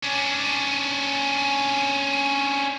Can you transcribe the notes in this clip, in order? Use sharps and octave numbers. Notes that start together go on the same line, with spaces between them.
C#4 D4